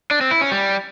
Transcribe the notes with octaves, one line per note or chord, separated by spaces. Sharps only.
D4
C4
E4
C#4
G3